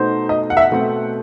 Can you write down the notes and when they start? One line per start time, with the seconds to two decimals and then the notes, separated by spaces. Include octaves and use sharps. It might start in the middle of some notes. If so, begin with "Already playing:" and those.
Already playing: B2 A3 D#4 C5
0.29 D#5
0.50 F#5
0.57 E5
0.61 F#5
0.72 B2 A3 C4